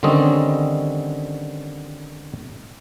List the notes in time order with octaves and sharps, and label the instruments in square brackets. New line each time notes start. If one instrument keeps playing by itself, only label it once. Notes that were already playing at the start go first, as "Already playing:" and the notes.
[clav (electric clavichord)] D3 D#3 G3 C4 C#4 D#5